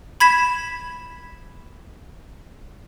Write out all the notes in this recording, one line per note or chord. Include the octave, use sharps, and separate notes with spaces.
B5 G#6 B6 E7